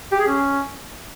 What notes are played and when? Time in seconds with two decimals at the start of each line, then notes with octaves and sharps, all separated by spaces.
0.12 G4
0.19 G#4
0.27 C#4